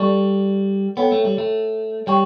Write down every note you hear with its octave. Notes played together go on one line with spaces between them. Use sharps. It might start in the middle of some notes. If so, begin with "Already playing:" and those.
Already playing: G3 A4 D5 A5 C#6
B3 A4 C#5 G5
A3
G3
A3
G3 C#5 G5 C#6